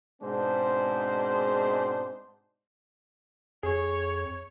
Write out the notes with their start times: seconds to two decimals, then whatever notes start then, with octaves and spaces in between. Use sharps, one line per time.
0.22 G#2 B2 G#3 C4 D4 C5
3.63 F2 G#4 C#5